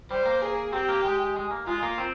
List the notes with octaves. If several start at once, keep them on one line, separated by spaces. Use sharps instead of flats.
G3 C5
A#3
G#4
C4 G4
A#3
G#3
G#3
A#3
G#3 F4
A#3
C4